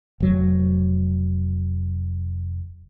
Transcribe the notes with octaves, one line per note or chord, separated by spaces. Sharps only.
F1 F#3